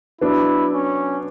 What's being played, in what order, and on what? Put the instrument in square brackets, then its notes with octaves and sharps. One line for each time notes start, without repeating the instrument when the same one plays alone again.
[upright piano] F#3 B3 D4 [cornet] E4
[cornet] C#4